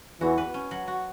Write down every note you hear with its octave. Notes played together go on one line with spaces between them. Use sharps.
E2 E3 F#4
B4
C#4
F#3
F#4